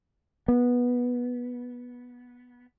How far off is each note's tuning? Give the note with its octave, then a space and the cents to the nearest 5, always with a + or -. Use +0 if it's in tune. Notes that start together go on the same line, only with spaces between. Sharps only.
B3 -10